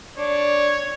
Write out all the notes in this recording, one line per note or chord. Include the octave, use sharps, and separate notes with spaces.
D4 C#5 D5